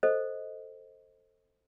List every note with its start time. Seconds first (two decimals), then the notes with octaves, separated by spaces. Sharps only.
0.03 A4 C5 D#5